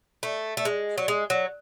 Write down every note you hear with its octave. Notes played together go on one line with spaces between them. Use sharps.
A3
A3
G#3
F#3
G#3
F#3